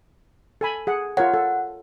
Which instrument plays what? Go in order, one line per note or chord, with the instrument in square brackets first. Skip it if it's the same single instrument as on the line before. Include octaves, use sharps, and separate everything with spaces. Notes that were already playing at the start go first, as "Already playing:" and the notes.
[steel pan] A4 G#5 B5
G#4 F#5
[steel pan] F4 A#4 C#5 [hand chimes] F#5
[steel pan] A4